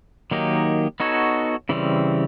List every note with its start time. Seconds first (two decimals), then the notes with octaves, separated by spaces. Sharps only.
0.31 D#3 F#3 A#3 D#4 G4
1.00 B3 D#4 F#4 A4 C#5
1.69 C#3 E3 G3 C4